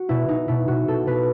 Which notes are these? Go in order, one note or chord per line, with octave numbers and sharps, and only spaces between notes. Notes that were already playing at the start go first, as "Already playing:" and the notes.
Already playing: F#4
B2 E4
B2 D#4
B2 E4
B2 F#4
B2 A4
B2 B4